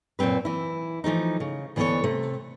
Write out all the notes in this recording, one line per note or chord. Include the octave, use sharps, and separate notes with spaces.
F#2 A#2 C#3 C4 B4
E3 E4
E3 F3 A3 D#4
C#3
D2 E3 B3 G#4 A4 C#5
C3 A3